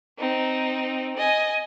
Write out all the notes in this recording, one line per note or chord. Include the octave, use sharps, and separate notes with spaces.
C4 D#4
D#5 G#5